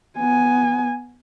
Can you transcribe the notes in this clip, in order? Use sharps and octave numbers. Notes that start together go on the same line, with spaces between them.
B3 G#5